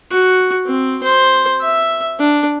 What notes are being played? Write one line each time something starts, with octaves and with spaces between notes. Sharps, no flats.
F#4
C4
C5
E5
D4